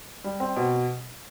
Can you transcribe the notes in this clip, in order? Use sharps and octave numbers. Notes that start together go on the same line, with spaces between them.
G3
C4
B2